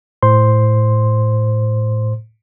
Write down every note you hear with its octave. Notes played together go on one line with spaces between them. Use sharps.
A2 C5 C6